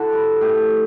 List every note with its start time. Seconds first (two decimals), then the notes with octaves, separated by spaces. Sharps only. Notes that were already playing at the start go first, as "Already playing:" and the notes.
Already playing: D3 E4 F#4
0.12 G3
0.41 A2 G4